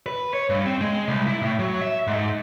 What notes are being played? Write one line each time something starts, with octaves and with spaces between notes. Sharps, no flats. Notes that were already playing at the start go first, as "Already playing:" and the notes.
B4
C#5
G2
C4
G#3
C2
E4
A2
F#3
E5
G#2